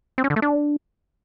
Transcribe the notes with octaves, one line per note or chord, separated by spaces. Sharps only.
C4
C#4
D3
A3
D4